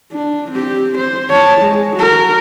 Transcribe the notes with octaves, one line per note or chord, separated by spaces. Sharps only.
D4
C4 G4
C5
C#5 A5
G#3
F#4 A#4